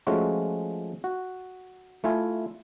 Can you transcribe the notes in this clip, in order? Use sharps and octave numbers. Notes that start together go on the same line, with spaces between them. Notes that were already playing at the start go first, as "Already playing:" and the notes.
F3 G#3 A3 C#4 F4 F#4
F#4
A3 E4 F4 G#5